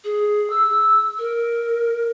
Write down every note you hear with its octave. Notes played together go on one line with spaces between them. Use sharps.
G#4
E6
A#4